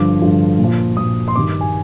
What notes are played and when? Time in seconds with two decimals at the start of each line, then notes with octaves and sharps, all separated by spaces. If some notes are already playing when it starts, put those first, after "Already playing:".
Already playing: G2 D3 F3 D6
0.21 G2 D3 F3
0.59 A#2 F3
0.97 A#2 F3 D#6
1.28 C6
1.36 G2 D#3 G3 D6
1.61 G#5